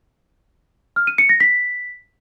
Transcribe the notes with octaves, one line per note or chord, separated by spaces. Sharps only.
F6
D#7
C#7
A#6
B6